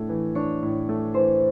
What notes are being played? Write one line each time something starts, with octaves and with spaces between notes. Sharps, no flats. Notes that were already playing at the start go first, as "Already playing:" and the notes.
Already playing: A2 A3 D4
E3
D4 C#5
A2
A3
E3 C5